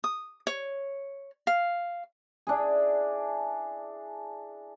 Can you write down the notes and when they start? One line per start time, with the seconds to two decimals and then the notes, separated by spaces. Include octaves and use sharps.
0.04 D#6
0.47 C#5
1.47 F5
2.47 D4 E4 G#4